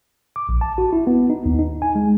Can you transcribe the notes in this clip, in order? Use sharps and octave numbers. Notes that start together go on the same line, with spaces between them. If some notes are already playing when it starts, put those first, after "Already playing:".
D6
A#1
A5
F#4
E4
B3
D#4
D#2
D#4
G#5
G#3